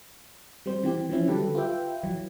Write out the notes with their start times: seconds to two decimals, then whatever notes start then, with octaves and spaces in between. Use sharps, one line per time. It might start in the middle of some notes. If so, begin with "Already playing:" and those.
0.66 G3 C4 C5
0.83 E3 C4 G4
1.09 E3 F3 C4 C#4 E4
1.27 D3 F#3 G3 G4 A4 B4
1.55 F4 G4 B4 E5 G5
2.03 E3 F#3